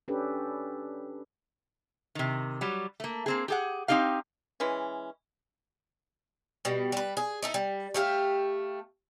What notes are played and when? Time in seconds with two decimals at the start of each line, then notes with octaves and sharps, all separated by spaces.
0.08 C#4 D4 G4 A4 B4
2.15 C3 D#3
2.61 F#3 G3
3.00 A3 A#3
3.26 A#3 C4 G#4
3.48 G4 G#4 F#5
3.88 C4 C#4 D#4 G4 F5
4.60 E3 G#3 C#4
6.65 B2 G3
6.92 G3 B4
7.17 G#4
7.43 D#4 E4 A4
7.54 G3
7.94 A3 G4 F5